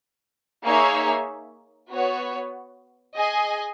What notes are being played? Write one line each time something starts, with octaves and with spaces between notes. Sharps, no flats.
A#3 D#4 G#4 C#5 E5
B3 F#4 C#5
G#4 D#5 G#5